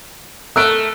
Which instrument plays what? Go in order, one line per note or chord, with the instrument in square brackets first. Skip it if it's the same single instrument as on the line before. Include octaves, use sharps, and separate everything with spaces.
[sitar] A3 A#4 [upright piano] E6 F#6 D7